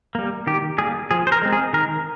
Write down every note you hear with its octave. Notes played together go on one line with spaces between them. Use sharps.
G3 A#3
D#3 G4
G3 A#3 G#4
F3 G#4
C5
A#4
G#3 C4
G#4
D#3 A#4